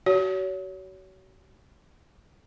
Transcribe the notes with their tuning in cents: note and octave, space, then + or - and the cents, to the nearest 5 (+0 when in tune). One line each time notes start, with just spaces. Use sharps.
F#4 +40 C#5 +30